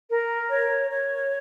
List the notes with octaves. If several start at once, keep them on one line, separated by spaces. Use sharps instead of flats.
A#4
C#5
C#5